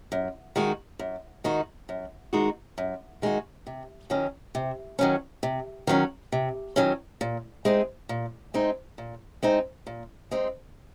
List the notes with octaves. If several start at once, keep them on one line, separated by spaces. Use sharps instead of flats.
F#2
D#3 G#3 D#4 F#4
F#2
D#3 G#3 D#4 F#4
F#2
D#3 G#3 D#4 F#4
F#2
D#3 G#3 D#4 F#4
C3
D#3 F#3 C#4
C3
D#3 F#3 C#4
C3
D#3 F#3 C#4
C3
D#3 F#3 C#4
A#2
G#3 C4 D#4
A#2
G#3 C4 D#4
A#2
G#3 C4 D#4
A#2
G#3 C4 D#4